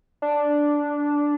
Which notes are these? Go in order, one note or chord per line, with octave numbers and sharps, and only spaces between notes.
D4